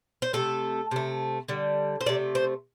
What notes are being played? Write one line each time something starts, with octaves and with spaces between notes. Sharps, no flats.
C5
C3 A3 A4
C3 A3
D3 G3
C5
C3 A3 D5
C5